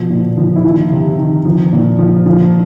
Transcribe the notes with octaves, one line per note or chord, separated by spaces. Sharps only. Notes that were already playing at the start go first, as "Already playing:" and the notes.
Already playing: B2 F3
A#2
F3
E4
D#3 F4
C3
D#3
F3
A#2
F3
F3